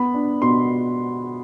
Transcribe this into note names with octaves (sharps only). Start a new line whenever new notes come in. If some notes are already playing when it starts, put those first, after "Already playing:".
Already playing: B3 B5
D4
B2 C6